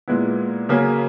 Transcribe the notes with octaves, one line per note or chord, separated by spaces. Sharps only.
A#2 G#3 B3 E4
C#3 F#3 A#3 C#4 G#4